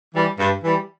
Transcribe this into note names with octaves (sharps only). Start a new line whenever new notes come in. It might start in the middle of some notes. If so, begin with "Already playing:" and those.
E3 G3
G2
E3 G3